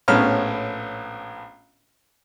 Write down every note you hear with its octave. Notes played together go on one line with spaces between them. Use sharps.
A#1 A2 B3 C#4 F6